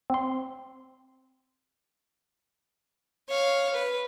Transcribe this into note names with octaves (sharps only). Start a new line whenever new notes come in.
C4 C6
C#5 F5
B4